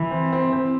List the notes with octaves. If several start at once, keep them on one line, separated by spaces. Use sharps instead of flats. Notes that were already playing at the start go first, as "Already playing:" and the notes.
Already playing: E3
C4
C4
C4